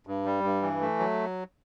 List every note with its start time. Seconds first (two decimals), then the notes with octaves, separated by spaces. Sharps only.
0.07 G2
0.26 G3
0.44 G2
0.62 E3
0.81 A3
0.99 F#3